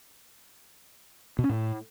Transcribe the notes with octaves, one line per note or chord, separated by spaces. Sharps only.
B2
C#4
A2